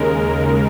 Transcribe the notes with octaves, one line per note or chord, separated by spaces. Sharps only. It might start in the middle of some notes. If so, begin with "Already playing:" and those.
Already playing: D#2 C#3 G#3 A#4